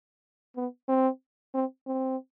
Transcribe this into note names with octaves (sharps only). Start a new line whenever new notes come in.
B3
C4
C4
C4